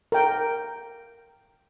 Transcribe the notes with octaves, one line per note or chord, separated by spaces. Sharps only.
A#4 G5